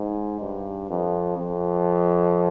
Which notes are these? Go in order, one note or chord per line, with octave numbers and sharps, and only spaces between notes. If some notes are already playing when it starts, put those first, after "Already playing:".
Already playing: G#2
G2
F2
F2